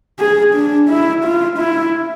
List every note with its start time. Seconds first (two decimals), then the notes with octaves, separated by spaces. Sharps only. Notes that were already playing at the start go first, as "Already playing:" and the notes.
0.19 G#4
0.54 D4
0.89 E4
1.24 F4
1.58 E4